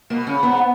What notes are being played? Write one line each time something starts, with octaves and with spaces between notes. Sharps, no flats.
B2 A#3
C#3 C#4
G#2 B3